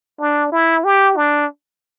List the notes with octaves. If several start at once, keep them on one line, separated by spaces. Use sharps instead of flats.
D4
E4
G4
D4